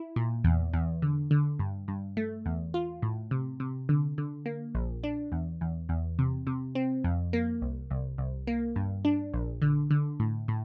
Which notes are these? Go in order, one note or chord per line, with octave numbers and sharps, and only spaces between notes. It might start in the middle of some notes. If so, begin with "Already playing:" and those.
Already playing: E4
A#2
E2
E2
D3
D3
G2
G2
A3
E2
F4
A2
C3
C3
D3
D3
A#3
A#1
D4
E2
E2
E2
C3
C3
C4
F2
A#3
C2
C2
C2
A#3
G2
D4
A#1
D3
D3
A2
A2